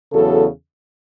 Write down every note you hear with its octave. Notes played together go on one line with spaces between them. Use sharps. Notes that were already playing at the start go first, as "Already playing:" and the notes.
E2 C#3 F#3 A4